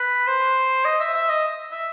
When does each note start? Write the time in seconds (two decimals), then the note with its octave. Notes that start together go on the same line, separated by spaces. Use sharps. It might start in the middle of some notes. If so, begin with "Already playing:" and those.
Already playing: B4
0.27 C5
0.85 D#5
1.00 E5
1.14 E5
1.29 D#5
1.72 E5